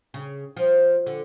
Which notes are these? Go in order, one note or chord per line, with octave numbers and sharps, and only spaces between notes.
C#3
F3
D3